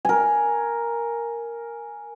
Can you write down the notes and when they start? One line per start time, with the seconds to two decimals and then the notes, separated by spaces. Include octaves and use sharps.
0.05 A#4 G#5